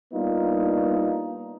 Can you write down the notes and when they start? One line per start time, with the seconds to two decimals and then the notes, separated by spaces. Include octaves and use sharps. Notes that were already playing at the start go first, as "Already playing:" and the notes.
0.13 G3 A#3 B3 D4 D#4 F4